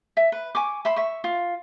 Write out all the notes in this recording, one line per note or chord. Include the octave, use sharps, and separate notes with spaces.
E5
B4
G#5 C#6 D6
E5 B5 C6
E5 C#6
F4